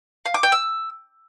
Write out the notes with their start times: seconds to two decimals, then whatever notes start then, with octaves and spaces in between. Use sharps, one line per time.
0.26 F5
0.34 D6
0.43 G5
0.52 E6